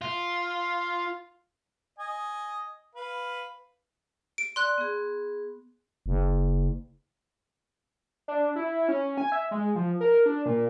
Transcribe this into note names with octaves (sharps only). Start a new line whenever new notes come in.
F4
D#5 G#5
B4 F5
D7
D5 C6 F#6
B3 G#4
F#1
D4
E4
C#4
G#5
E5
G#3
F3
A#4
D4
A#2